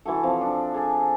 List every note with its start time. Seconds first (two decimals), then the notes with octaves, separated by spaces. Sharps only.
0.05 E3 E4 F#4 A4
0.23 F3 C4
0.41 D4
0.74 G#4 A4 G#5